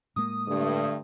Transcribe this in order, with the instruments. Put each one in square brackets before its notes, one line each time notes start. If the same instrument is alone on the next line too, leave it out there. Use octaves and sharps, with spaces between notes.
[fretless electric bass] A2 G#3 A#3 [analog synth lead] D#6
[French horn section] G2 A3 [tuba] D3